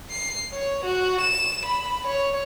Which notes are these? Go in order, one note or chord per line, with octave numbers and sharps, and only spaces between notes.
C7
C#5
F#4
E7
B5
C#5